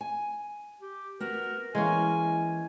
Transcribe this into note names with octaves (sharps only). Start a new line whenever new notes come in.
G#5
G4
B3 F#4 A#4
E3 G#3 A#3 C#4 G#5